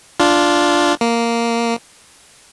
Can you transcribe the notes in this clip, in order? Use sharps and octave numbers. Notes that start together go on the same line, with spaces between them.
D4 F4
A#3